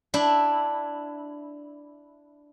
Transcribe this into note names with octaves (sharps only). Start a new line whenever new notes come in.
D4 E4